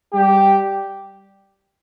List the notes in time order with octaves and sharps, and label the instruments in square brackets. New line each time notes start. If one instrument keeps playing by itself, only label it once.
[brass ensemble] G3 G4